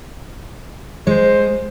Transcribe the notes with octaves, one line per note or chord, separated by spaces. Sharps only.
G#3 C5